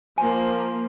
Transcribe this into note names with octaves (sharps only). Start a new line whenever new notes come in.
F3 A#3 G#5